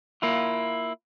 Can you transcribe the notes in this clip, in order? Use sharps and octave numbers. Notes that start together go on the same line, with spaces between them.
A#3 E4 F4